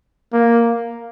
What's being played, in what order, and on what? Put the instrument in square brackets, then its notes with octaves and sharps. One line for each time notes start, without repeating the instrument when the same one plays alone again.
[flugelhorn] A#3